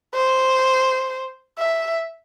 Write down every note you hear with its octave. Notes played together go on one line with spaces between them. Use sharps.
C5
E5